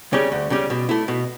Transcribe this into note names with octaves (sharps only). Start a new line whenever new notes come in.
C#3 G3 C#4
D2
C#3 G3 C#4
B2
A3 E4
B2